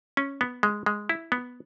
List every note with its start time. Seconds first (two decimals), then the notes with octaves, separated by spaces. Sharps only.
0.17 C#4
0.41 B3
0.63 G#3
0.86 G#3
1.09 E4
1.32 B3